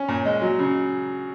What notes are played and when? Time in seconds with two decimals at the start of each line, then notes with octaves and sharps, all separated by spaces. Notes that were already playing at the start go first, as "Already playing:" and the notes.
Already playing: C#4
0.08 A#2
0.25 G#3
0.42 F#3
0.59 C#3